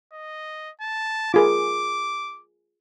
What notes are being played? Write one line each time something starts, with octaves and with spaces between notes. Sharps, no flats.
D#5
A5
F4 G#4 A#4 D6